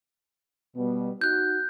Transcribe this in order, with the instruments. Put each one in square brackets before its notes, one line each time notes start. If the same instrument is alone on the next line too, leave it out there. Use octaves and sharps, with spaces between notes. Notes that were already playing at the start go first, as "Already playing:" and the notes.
[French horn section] B2 G3 B3
[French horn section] D#4 F#4 [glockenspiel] F#6 G6